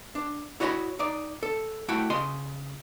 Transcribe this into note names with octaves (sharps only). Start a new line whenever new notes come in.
D4
E4 F#4 C#5 D#5 A5 B5
D#4 D5
A4
A3 E4 F#4 G5
C#3 D#5 C6